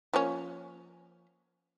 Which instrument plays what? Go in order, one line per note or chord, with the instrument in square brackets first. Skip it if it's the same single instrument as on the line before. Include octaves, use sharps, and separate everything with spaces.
[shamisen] F3 A#3 C#4